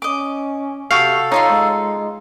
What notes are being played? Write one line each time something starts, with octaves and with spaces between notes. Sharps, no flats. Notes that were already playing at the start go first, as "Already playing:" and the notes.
C#4 D#5 D6
C3 F#4 A4 F5 G5
D#4 F4 C#5 C6
G#3